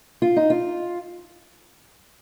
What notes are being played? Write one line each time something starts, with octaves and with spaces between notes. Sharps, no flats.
F4
D#4
F4